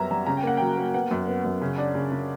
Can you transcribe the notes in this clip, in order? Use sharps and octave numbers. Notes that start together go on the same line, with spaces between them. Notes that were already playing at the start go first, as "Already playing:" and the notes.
Already playing: F#2 G3 B3 C#4 E5 F#5 A#5
G3 A#5
C#3 A#5
G5
A#3 F#5
F#3 G5
A#3
B3 F#5
F#2
B3
F#2
C#3
D4
C#3
C#3